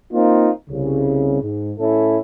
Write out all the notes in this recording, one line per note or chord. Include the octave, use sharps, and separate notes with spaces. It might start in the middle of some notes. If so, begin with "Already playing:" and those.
A#3 C4 D#4 F4
C2 C#3
G#2
A2 C#4 E4 A4